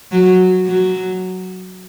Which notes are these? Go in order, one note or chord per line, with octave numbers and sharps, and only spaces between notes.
F#3
F#3